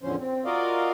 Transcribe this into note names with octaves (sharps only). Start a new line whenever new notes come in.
E2 A2 D3 F3 C#4 C5
C4
F4 F#4 A#4 D5 D#5 F5